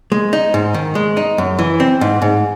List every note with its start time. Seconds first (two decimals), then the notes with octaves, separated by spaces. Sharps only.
0.12 G#3
0.33 D#4
0.54 G#2
0.74 D#3
0.95 G#3
1.17 D#4
1.38 F#2
1.59 E3
1.80 C4
2.01 G#2
2.22 G#2